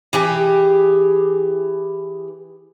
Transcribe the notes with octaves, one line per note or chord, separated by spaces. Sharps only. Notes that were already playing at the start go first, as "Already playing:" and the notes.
E3 G4 G#4